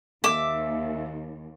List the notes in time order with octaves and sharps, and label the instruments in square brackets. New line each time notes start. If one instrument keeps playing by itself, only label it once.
[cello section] D#2 [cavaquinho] E5 D6